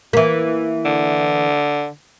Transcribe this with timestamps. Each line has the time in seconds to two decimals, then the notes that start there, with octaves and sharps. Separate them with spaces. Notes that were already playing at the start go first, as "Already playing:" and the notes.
0.13 E3 A#3
0.85 D3